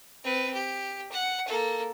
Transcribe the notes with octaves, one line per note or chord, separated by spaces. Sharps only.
C4 B4
G4
F#5
A#3 A4